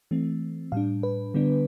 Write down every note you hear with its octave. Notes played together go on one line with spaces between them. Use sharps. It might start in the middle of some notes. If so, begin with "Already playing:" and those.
E3 A3 C4
A2 G3 D4 F5
B4
D3 G3 B3 D4